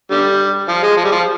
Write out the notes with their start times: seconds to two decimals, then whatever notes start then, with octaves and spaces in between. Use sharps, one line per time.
0.11 D3 G3
0.68 F3
0.83 G#3
0.97 F3
1.04 G3
1.12 F3